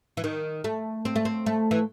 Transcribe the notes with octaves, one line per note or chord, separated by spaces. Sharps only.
E3
D#3
A3
C4
A3
C4
A3
E3